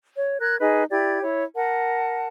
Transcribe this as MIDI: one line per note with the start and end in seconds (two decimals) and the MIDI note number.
0.16 0.37 73
0.41 0.56 70
0.41 0.56 90
0.41 0.56 92
0.60 0.83 63
0.60 0.83 68
0.60 0.83 71
0.60 0.83 75
0.90 1.21 64
0.90 1.21 67
0.90 1.21 74
0.90 1.21 92
1.21 1.43 64
1.21 1.43 73
1.55 2.27 70
1.55 2.27 78
1.55 2.27 81